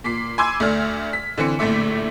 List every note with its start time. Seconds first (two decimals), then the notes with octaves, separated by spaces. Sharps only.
0.04 A#2 D6 B6 C7
0.38 G#5 B5 C6 D6 E6 G#6
0.60 D2 A3 D5 F6
1.13 B6
1.38 D3 E3 C4 C#7
1.59 A#1 A2 D3 A3 E5 D6